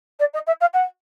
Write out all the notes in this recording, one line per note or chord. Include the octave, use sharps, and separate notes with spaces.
D5
D#5
E5
F5
F#5